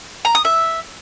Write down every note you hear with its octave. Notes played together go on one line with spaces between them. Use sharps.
A#5
D#6
E5